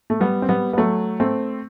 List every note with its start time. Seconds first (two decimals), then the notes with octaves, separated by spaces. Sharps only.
0.10 A3
0.20 G3 B3
0.42 C4
0.49 G3 B3
0.73 B3
0.77 F#3 A3
1.20 A3 C4